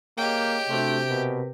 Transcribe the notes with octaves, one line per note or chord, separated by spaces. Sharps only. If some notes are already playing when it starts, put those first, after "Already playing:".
A#3 G4 G#4 C#5 D#5 G5
C3 A3 D4 F#4 C6
B2 A#4 B4